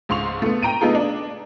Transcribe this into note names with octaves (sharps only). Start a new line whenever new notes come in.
C#2 G#2 C6 C#6 F7
A3 B3
G5 A#5 D7 D#7
A3 B3 D#4 F4 G#4 A4
D4